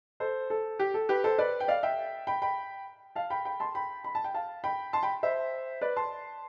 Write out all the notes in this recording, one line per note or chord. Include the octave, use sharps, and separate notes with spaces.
A4 C5
A4
G4
A4
G4 B4
A4 C5
B4 D5
G5
D5 F5
E5 G5
G5 B5
G5 B5
F5 A5
G5 B5
G5 B5
A5 C6
G5 B5
B5
A5
G5
F5 A5
G5 B5
A5 C6
G5 B5
C5 E5
B4 D5
A5 C6